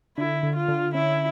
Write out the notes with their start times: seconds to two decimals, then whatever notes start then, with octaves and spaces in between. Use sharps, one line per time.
0.18 D3 E4
0.43 D3
0.56 F4
0.68 D3
0.94 C#4 E4